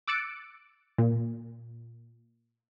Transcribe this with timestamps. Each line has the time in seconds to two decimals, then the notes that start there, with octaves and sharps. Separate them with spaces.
0.07 D6 E6 F#6 A6 C#7 D7
0.98 A#2